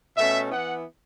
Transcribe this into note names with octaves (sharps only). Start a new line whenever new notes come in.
B2 A3 C#4 E5
E3 B3 E4 F#5